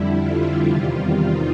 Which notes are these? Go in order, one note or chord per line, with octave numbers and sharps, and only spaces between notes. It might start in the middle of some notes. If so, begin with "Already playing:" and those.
Already playing: F2 D3 G3 E4
F4
E2 C3 D#3 G3
D#4